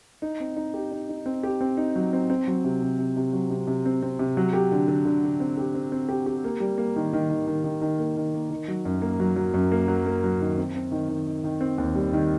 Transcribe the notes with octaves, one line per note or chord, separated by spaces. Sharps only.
D#4
C4
D#4
G4
D#4
D#4
C4
G4
C4
D#4
F#3
C4
C4
F#3
C3
C3
C3
C3
F#3
C3
C3
C4
C4
C3
F#3
G4
D3
D3
D3
D3
C4
G4
C4
C4
G4
G4
A#3
G3
A#3
D#3
D#3
D#3
D#3
D#3
D#3
A#3
D#3
A#3
D#3
F#3
F#2
A#3
F#3
F#3
F#2
A#3
F#3
A#3
F#3
D#3
C4
C4
D#3
D#3
D#3
D#3
C4
D#2
G3
D#3